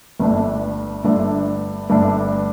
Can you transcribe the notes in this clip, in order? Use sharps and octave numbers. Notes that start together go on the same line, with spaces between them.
G1 G2 D3 A3 D4
G1 G2 D3 A3 D4
G1 G2 D3 A3 D4